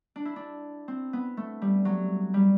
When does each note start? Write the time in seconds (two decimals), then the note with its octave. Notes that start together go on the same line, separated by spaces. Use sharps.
0.16 D4
0.25 E4
0.36 D4
0.88 C4
1.13 B3
1.37 A3
1.62 G3
1.85 F#3
2.34 G3